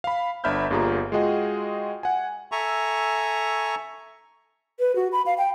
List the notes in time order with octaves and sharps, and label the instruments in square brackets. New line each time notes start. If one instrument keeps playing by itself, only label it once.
[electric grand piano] F5 B5
G1 D4 E5 B5 F6 G6
G1 G2 A#3 F4 G#4 A#5
G#3 F4 F#4 G#4 D#5 G5
F#5 G#5
[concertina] A4 E5 G#5 A#5 C#6
[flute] B4
F#4
B5
F5
G5